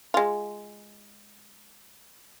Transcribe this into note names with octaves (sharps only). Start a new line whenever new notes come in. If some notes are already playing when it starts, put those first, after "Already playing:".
G#3 F4